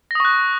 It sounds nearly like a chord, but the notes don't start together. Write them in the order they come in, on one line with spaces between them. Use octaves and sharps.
A#6 D#6 C#6 F#6